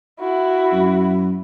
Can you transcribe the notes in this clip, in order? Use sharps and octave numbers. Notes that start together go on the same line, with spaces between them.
E4 F#4
F#2